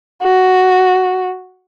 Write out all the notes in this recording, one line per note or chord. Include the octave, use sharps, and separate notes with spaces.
F#4